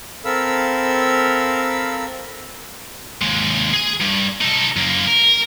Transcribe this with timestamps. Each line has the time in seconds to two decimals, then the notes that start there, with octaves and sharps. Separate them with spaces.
0.25 C4 A4 A#4 F5 B5 E6
3.22 D#2 G#3
3.73 G#4 G#5
4.01 G2
4.41 D#4 A4
4.76 F#2 A#3
5.08 A#4